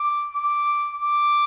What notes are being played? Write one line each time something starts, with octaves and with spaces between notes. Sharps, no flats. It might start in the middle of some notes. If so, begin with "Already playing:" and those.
Already playing: D6
D6
D6